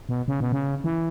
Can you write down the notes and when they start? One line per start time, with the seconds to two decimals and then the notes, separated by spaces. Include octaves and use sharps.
0.09 B2
0.28 C#3
0.41 B2
0.52 C#3
0.84 E3